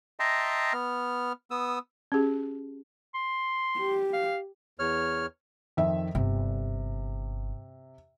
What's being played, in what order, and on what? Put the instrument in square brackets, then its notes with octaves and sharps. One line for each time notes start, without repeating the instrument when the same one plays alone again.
[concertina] D#5 E5 G5 A5 A#5 C6
B3 F6
B3 D#6 E6
[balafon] C#4 G4 G#4
[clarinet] C6
[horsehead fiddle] G4
[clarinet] F5
[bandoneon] E2 C#5 F6
[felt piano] F2 D#3 E5
[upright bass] G1 [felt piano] C3